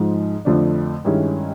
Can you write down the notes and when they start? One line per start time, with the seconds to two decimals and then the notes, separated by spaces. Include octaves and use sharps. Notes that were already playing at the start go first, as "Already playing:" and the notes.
Already playing: G#2 F3 G#3
0.45 F2 D3 F3 A3 D4
1.05 G2 D#3 G#3 C#4 E4